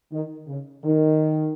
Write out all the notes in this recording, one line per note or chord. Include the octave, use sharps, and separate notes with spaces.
D#3
C#3
D#3